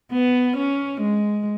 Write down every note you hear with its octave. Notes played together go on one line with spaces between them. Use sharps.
B3
C#4
G#3